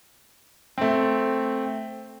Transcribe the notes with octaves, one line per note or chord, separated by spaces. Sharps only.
A3 C4